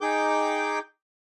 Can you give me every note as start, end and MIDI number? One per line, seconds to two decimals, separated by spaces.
0.01 0.79 63
0.01 0.79 68
0.01 0.79 79
0.01 0.79 86
0.01 0.79 91